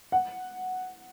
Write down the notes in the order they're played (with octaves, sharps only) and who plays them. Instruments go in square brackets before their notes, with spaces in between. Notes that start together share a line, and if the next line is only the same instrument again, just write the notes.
[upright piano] F#5